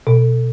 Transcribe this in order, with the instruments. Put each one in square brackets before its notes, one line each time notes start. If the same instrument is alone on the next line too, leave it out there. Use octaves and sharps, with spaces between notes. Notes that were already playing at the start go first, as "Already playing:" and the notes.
[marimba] B2